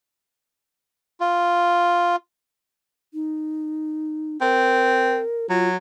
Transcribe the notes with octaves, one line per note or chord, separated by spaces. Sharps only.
F4
D#4
C4 A#4
F#3 F4